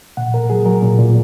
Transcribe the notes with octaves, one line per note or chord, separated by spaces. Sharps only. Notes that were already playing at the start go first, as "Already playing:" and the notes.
A#2 F#5
A#2 A#4
F#3 G#4
F#3 A#4
A#2
A#2